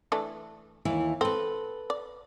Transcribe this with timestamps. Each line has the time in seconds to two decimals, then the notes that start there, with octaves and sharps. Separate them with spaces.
0.12 E3 A3 D4
0.85 D#2 E3 E4
1.21 C4 A4 B4
1.90 D5